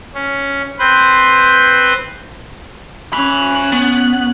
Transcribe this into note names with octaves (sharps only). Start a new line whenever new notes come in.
C#4
C4 B4 C5
C#4 G#5 B5 F#6
B3